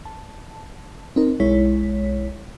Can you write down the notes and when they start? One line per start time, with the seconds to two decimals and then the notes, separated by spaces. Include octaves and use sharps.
0.05 A5
1.16 C4 D#4 A#4
1.40 B1 G#3 E4 C#5 B6